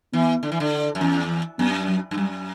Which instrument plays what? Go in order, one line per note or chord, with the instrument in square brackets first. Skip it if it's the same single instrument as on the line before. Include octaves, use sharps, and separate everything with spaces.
[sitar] E3 [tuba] B3
[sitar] D3
E3
D3
F#2
[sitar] E2 [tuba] C#4
[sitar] F#2 [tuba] B3
[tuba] F#3
[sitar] G2
[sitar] F#2 [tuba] G3